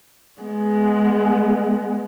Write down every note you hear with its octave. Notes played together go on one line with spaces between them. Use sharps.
G#3 B3